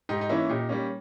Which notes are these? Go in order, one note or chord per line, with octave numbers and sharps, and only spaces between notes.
G#2 D#4 G4
D#4
E3 A#3 C#4 E4
A#2 D#4 G4
G3 A#3 C#4